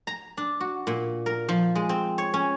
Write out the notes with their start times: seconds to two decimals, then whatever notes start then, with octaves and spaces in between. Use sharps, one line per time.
0.07 A#5
0.37 D4
0.60 F#4
0.87 A#2
1.26 A#4
1.49 F3
1.75 G#3
1.89 C4
2.18 C#5
2.34 C#4